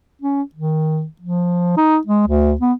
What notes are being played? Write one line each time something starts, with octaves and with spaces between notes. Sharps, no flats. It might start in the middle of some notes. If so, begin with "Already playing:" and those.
C#4
D#3
F3
D#4
G#3
D2
B3